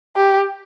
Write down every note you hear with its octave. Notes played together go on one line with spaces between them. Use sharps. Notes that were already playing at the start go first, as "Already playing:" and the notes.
G4